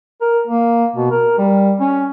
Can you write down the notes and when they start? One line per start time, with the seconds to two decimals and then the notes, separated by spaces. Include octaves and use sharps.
0.21 A#4
0.47 A#3
0.96 B2
1.11 A#4
1.38 G3
1.80 C#4